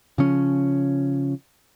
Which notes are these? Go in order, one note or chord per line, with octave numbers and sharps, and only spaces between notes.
C#3 F3 C#4